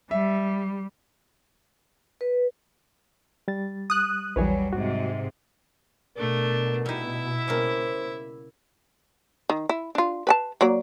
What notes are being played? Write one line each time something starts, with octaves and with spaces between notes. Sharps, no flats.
G3 E5
B4
G3 A6
D#6 F#6
A#1 E2 F#3 G3 B4 C#5 G#5
G#2 C3 F#4
B2 A3 D4 A#4
G3 D#4 E4 E5
C#3 G3 A#3 C5
D#3
E4
D4 F4
B4 G#5 A5
F#3 A#3 D5